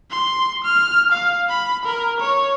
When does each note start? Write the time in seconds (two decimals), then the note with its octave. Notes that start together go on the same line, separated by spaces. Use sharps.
0.11 C6
0.64 F6
1.12 F5
1.49 B5
1.85 A#4
2.20 C#5